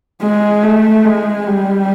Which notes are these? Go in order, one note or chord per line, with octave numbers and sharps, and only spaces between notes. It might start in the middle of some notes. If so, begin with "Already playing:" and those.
G#3
A3
G#3
G3